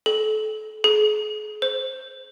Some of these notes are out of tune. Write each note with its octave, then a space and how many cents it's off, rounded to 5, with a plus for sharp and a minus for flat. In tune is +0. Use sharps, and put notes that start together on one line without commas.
A4 -30
G#4 +40
C5 +0